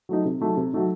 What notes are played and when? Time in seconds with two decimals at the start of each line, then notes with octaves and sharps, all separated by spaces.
0.09 F#3 A3 D#4
0.25 C3
0.41 F#3 A3 D#4
0.57 C3
0.73 F#3 A3 D#4